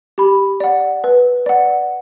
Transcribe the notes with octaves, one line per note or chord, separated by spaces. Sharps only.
G4 B5
D5 F#5
B4
D5 F#5